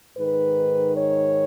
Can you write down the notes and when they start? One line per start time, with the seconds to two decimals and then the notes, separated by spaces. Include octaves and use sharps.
0.15 G#2 D#3 B4
0.96 C#5